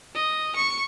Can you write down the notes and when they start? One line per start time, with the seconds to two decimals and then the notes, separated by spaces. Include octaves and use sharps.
0.15 D#5
0.56 C#6